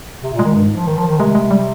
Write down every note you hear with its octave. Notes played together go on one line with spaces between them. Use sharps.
C3
A#2
G#3
D#3
G2
G#2
F3
D#3
F3
D#3
C3 G#3
G#3
G3